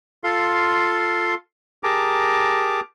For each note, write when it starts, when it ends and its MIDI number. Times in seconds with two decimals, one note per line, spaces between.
0.24 1.35 65
0.24 1.35 69
0.24 1.35 77
0.24 1.35 84
1.84 2.81 67
1.84 2.81 68
1.84 2.81 70
1.84 2.81 81
1.84 2.81 82
1.84 2.81 86